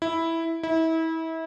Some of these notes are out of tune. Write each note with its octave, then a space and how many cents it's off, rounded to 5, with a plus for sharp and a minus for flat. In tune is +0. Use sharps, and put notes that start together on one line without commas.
E4 -5
E4 -30